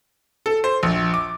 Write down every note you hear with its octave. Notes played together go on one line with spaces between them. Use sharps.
A4
C5
A#1
D6